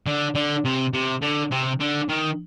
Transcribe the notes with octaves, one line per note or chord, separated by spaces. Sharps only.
D3
D3
C3
C3
D3
C3
D3
D#3